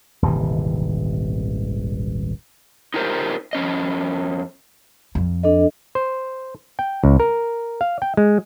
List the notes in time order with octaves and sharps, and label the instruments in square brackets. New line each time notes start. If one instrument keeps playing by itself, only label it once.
[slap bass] D#1 G#1 C3 E3
[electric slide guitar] D#4 F4 G4 A#4 C5
F2 C#4 D#5
[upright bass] F2
[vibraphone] D4 A4 D#5
[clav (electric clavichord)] C5
G5
C#2
A#4
F5
G5
G#3